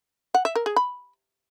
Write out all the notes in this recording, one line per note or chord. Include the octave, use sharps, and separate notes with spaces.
F#5
E5
A#4
G#4
B5